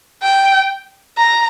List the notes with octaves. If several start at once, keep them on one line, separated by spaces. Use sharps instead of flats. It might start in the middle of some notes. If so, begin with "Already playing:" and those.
G5
A#5